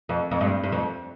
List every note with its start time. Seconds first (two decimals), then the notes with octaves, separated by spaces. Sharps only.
0.09 F2
0.31 F2
0.41 G2
0.64 G2
0.72 F2